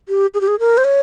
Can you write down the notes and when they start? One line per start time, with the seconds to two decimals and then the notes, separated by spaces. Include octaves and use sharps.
0.09 G4
0.34 G#4
0.41 G4
0.48 G#4
0.59 A#4
0.77 C5
0.84 C#5